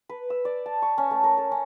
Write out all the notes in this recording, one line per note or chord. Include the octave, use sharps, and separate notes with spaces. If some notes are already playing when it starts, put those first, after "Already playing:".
B4
E6
D5
A5
C#6
C#4
A3
A#4
A4
C#4